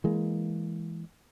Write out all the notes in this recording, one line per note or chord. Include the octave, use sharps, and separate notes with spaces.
E3 G#3 A#3